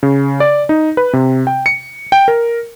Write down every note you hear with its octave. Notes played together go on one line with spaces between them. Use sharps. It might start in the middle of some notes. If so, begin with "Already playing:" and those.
C#3
D5
D#4
B4
C3
G5
C#7
G5
A#4